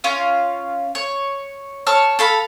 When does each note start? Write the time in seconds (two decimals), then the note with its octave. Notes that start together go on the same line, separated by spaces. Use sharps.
0.04 C#4 F4 F5
0.95 C#5
1.87 C#5 A5 F6
2.19 A4 F5 B5